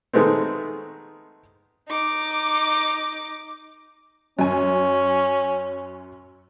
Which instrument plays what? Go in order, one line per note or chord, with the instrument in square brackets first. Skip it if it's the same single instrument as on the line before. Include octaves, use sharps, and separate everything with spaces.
[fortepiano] D#3 G#3 A3 B3 C4
[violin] D#4 D6
[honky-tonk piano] F#2 G#5 [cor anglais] C#4